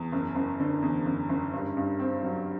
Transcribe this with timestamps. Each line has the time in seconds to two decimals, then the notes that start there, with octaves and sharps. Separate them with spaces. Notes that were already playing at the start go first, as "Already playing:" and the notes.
Already playing: E2
0.12 F#1
0.35 F#1
0.60 D3
0.82 E2
1.06 F#1
1.29 F#1
1.53 G2
1.77 G2
2.00 C4
2.23 F#3